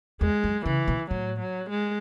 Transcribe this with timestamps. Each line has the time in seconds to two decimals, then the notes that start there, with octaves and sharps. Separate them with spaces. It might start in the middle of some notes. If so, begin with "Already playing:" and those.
0.21 E2 G#3
0.44 F#2
0.66 C#3 E3
0.88 B2
1.11 A2 F#3
1.40 F#3
1.70 G#3